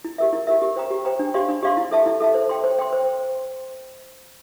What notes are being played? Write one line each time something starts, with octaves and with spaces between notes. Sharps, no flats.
E4
G4 A#4 E5
E4
G4 A#4 E5
G4
C5 G5 A#5
G4
C5 G5 A#5
D4
G4 D5 F5 C6
D4
G4 D5 F5 C6
E4
A4 E5 A5
E4
A4 E5 A5
C5
G5 C6
C5
G5 C6
C5